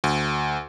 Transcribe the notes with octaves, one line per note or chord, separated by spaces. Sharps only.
D2